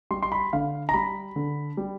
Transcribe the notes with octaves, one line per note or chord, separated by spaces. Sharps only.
G3 C6
C6
B5
D3 F5
A#5
G3 B5
D3
G3